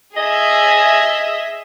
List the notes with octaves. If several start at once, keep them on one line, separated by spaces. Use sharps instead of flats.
G#4 D#5 E5